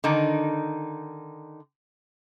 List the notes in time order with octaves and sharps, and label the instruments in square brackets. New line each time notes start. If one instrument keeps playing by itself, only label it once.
[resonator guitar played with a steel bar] D3 D#3 D#4